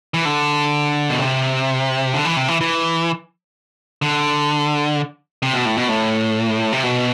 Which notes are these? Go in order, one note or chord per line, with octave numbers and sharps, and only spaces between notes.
E3
D3
B2
C3
D3
E3
C3
E3
E3
D3
C3
B2
A2
B2
A2
C3
B2